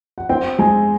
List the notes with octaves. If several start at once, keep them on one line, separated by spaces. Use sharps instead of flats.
F#5
C4 G5
G#3 G#5